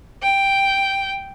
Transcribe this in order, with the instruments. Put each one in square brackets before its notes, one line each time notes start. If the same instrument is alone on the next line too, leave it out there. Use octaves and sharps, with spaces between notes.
[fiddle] G5